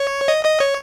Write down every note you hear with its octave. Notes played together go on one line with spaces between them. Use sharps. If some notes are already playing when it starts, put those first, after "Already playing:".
Already playing: C#5
D#5
D#5
C#5